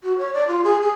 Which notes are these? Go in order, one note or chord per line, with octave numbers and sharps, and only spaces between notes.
F#4
C#5
D5
F4
G#4
G#4